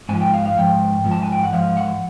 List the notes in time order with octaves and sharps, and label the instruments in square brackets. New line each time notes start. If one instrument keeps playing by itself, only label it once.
[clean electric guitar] G#2 F3 G#5
G5
F5
F5
G#2 F3 G5
G#2 F3
A5
G#5
G5
F#5
G#2 F3 F5
F#5